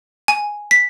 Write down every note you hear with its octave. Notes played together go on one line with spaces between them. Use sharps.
G#5
B6